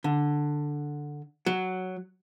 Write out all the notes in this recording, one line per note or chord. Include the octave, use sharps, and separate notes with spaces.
D3
F#3